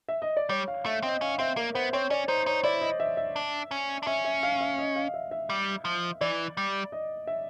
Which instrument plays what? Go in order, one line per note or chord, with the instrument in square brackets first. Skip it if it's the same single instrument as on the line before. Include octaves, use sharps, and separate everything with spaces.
[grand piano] E5
D#5
D5
[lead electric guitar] G3 [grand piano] C#5
[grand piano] F5
[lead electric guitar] A3 [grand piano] E5
[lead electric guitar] C4 [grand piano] D#5
[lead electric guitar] C#4 [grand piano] F5
[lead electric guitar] C4 [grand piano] E5
[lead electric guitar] A#3 [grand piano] A#4
[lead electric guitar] B3 [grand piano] C5
[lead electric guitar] C4 [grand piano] C#5
[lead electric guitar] C#4 [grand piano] D5
[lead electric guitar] D#4 [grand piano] C5
[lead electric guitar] D#4 [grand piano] C#5
[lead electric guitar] E4 [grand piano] D5
[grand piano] D#5
E5
E5
[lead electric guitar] D4
C#4
D4
[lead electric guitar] C#4 [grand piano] E5
[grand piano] E5
F5
E5
D#5
F5
E5
E5
[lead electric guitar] G3
F3
[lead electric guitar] E3 [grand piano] D5
[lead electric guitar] G3
[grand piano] D#5
E5